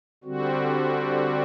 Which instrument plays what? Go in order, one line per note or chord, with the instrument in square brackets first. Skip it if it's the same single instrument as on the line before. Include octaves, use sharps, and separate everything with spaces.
[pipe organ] D3 G3 C4 F#4